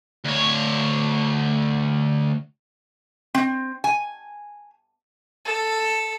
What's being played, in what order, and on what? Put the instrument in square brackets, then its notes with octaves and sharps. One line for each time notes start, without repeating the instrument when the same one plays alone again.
[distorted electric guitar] D2 C#5
[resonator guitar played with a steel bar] C4
G#5
[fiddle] A4